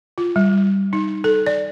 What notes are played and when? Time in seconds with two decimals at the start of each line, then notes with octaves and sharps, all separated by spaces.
0.18 F4
0.36 G3
0.93 D#4
1.24 A4
1.46 D5